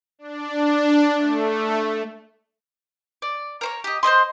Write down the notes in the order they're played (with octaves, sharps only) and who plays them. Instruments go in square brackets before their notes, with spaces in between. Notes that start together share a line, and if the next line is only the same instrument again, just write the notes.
[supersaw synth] D4
A3
[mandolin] D5
A#4 C5 C#5
G4 D#5
C5 D5 D#5 C6